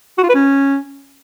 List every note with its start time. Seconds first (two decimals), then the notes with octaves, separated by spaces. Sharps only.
0.18 F#4
0.23 F4
0.29 B4
0.34 C#4